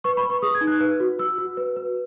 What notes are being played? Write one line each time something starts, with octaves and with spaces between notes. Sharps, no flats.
B4 C#6
B5
B4
C#6
G#4 D#6
G#6
D#4
F#6
B4
F#4
F#4 E6
F#4
B4
B4